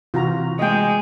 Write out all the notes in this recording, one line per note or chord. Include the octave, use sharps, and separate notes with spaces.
C3 E3 F4 F#4 A#5
G#3 D#5 G5